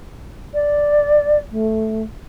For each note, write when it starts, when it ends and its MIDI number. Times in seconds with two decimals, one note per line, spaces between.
0.54 1.39 74
1.51 2.02 57